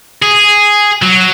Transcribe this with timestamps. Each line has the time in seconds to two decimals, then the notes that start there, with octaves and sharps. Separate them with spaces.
0.22 G#4
1.02 F#3